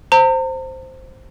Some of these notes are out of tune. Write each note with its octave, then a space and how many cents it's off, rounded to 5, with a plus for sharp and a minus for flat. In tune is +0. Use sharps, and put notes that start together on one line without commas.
C5 +0 A#5 -45